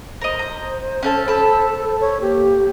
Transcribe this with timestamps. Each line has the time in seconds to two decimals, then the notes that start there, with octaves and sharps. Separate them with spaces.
0.21 A#4 C5 D#5
0.39 A#5
1.03 C#4 A4 A5
1.28 A4 A5 B5
2.01 A4 C#5
2.21 A#3 G4